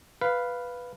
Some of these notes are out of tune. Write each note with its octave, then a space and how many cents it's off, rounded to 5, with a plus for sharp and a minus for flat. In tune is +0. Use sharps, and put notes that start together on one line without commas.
B4 +0 F5 +0